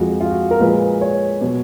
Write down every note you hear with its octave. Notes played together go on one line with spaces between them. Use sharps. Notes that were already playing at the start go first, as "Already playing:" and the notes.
Already playing: F2 F3 G#3 F#4
F4
F#4
A#4
A#2 F3 G#3 B4
C#5
B2 F#3